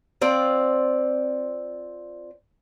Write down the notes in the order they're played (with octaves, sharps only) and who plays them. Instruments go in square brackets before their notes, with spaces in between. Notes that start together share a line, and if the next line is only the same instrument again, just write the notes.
[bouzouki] C4 F4 D5